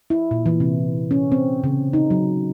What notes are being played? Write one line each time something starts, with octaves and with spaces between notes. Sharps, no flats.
E4
A#2
E3
C3
C#4
C4
C#3
D#4
F#3